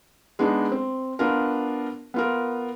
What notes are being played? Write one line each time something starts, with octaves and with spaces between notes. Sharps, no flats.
G#3 B3 D4 D#4
C4
B3 D4 F4 A#4
B3 F4 A#4